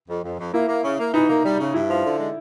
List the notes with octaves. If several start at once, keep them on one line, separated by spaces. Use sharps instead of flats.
F2
F2
F2
A#3 E4
A#3
C#3
A#3
E3 D#4
A#3
G3
C#3
G2 E4
F3
D3
G#3